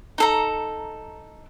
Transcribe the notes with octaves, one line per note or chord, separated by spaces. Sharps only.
D#4 A4 A#5